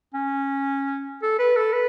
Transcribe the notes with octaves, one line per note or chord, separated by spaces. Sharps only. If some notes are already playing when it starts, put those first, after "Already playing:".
C#4
A4
B4
A4
B4